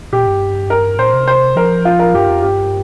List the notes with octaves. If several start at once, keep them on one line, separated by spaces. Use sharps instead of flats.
A#2 G4
G2
A#4
A#2 C5
C3
C5
F3 A#4
F4
A#4
G2 G4
F2
G2 G4